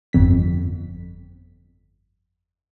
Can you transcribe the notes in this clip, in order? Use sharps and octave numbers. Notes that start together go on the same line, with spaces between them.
G1 F2 B6